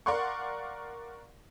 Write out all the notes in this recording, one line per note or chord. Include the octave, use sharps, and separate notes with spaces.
A#4 D5 F5 F#5 C6 C#6